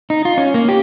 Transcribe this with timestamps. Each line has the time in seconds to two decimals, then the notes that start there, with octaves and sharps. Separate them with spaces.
0.10 D#4
0.25 F4
0.38 C#4
0.54 A#3
0.69 G4